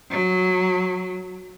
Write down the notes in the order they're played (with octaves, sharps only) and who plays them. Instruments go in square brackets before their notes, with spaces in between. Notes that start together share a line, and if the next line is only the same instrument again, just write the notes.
[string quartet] F#3